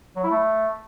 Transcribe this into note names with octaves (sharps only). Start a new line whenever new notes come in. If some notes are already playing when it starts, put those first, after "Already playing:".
F#3
E4
A3